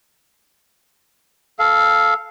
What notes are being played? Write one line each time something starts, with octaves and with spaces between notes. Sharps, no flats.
A4 F5